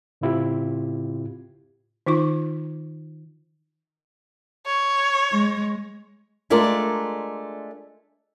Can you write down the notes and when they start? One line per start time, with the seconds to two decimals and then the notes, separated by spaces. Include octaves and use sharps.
0.21 A2 C#3 C4 E4 F4 G4
2.06 D#3 D#4 F4 C#6
4.66 C#5
5.32 G#3
6.50 G#3 A3 D4 F4 A#4 D5